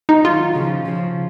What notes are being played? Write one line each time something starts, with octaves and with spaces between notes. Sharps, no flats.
D#4
D#3 F#3 F4
C#3 F3
C#3 F3